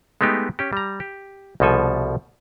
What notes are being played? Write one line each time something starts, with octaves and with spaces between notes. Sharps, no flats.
G#3 A3 B3 D#4 G4
C#4 G4
G3 A#5
G4
C2 B2 F3 A4 G#5